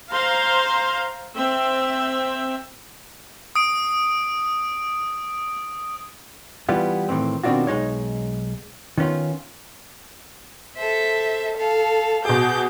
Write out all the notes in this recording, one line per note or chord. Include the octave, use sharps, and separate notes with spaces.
C5 F5 A#5 C6
C4 E5
D#6 D7
E3 G3 B3 F4
A2 D#3 E3 C4
B2 D#3 C4 D4 F4 F#4
B1 G#3 D#4 C#5
D#3 B3 C#4 F4
A4 C5 E5
A4 F5
B2 G#4 D6 G6